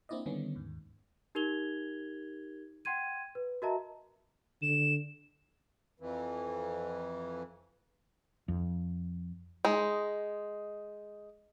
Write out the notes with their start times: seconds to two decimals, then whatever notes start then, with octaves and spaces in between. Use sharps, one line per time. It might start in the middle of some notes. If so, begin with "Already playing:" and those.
0.09 A#3 C4 D4 E4 D5 D#5
0.26 D3 D#3 G3 B3 C#4
0.55 D#2 G#2
1.35 D#4 G4 A#4 G#6 F7 G7
2.85 F#5 G5 C6 G#6 D#7
3.35 B4
3.62 F#4 A#4 D#5 E5 A5 A#5
4.62 D3 E7
6.00 F2 E3
8.48 F2
9.65 G#3 D#4